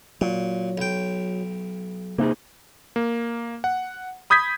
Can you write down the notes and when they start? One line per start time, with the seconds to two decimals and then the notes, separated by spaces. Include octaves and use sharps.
0.21 A#2 F#3
0.78 B1 G5
2.18 C3 A#3 D#4 G#4
2.96 A#3
3.64 F#5
4.30 B5 D#6 G6 G#6 B6